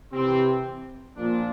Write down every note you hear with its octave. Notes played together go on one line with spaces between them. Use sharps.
C3 E3 C4
A#2 F3 D4